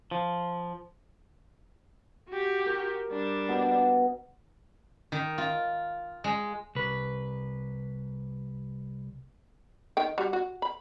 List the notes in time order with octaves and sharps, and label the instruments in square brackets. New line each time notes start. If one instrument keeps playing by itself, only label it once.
[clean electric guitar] F3
[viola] F#4 G4
[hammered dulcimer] A#4
[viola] G3 D4
[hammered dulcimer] B2
[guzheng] D#3
F4
G#3
[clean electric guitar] C2 B4
[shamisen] D#3 G5
G3 F#4
F#4
B5